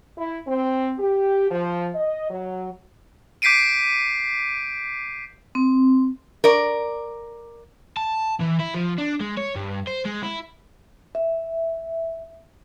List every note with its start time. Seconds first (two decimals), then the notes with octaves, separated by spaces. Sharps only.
0.17 E4
0.47 C4
0.99 G4
1.51 F3
1.95 D#5
2.30 F#3
3.42 D6 G6 B6 C7 D7 D#7
5.55 C4
6.44 A#4 D5
7.97 A5
8.40 E3
8.60 E4
8.75 F3
8.98 D4
9.21 G#3
9.38 C#5
9.56 G2
9.87 C5
10.05 G#3
10.23 E4
11.15 E5